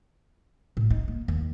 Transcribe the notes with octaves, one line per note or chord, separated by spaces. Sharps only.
A2
D#4
A#3
D#2